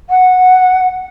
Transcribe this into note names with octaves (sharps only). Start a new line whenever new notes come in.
F#5